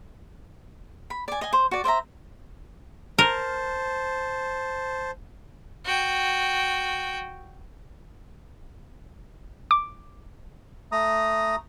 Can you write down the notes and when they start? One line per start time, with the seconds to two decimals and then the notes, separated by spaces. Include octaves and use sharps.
1.10 B5
1.28 D5 G#5
1.41 D#5 G#5
1.53 C5
1.71 F#4 D5
1.84 C5 D5 E5 A#5
3.19 A#4 C5 A5
5.84 F#4 G5
9.71 D6
10.92 A3 A#5 D#6